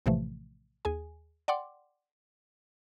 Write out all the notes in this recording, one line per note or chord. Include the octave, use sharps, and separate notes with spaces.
A#1 A2 C3 E3 F3 A3
D#2 G#4 G#5
D5 F#5 G5 C6 D6